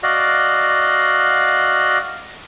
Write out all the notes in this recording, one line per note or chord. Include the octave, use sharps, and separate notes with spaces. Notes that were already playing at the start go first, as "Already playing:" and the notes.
F#4 D5 D#5 F5